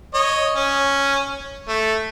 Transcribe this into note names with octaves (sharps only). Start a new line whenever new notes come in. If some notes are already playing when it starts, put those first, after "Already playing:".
C#5 D#5
C#4
A3